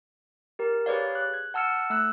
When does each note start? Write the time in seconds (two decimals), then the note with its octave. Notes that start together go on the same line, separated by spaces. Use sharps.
0.59 G4 A#4
0.86 G4 G#4 B4 C#5 D5 F5
1.15 F#6
1.34 G#6
1.54 F#5 A5 E6 F6 C#7
1.90 A3 E6 F#6